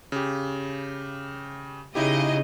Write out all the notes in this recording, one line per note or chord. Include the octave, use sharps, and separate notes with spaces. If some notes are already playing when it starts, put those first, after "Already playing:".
C#3 G4
C#3 D#4 E4 G4 D#5